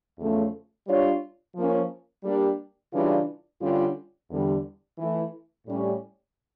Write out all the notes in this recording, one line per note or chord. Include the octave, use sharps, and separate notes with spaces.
E2 C#3 F3 A3 C#4
G3 D4 F4 C#5
F3 A#3 C#4
G3 A#3 D4 G4
C#3 E3 G3 D4 F4
G2 D3 G3 C#4 F4
E2 D3 G3
E3 A3 E4
A2 G3 C#4